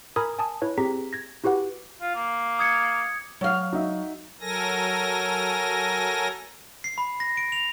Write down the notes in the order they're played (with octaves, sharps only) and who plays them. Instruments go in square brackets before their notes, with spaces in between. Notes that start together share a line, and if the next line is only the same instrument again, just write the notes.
[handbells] A#4 G#5 A#5 B5 D#6 G#6
G#5 A5 D#6
E4 B4 C#5
C4 G4 G#4 A#5 B6
G#6 A#6
E4 F#4 G4 B4 F#5
[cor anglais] F4
A#3
[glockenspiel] D#6 G#6 C#7
[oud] F#3 F5
[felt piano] D#4 F#4 E5
[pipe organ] F#3 A4 A#4 G#5 A#6
[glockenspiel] C7
B5
A#6
D7
F7